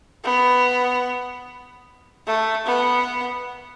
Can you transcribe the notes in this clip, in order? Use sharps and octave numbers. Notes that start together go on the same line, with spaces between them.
B3
A3
B3